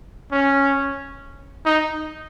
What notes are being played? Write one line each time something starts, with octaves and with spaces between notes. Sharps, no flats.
C#4
D#4